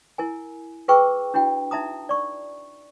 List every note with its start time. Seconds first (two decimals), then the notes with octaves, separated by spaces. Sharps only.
0.18 E4 A#4 G#5
0.88 F4 G#4 B4 G5 C#6 E6
1.34 D4 E4 F#4 G5
1.71 D#4 E5 A5 A#5 D#6
2.09 D5 C#6